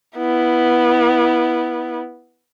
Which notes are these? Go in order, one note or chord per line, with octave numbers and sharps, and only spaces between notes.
B3 E4